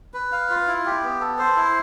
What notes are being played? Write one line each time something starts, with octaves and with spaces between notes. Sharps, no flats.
B4
F5
F4
E4
G4
B3
A4
C5
E4